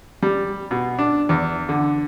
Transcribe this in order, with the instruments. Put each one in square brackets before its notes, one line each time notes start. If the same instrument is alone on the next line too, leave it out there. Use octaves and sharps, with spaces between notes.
[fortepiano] G3
B2
D4
E2
D3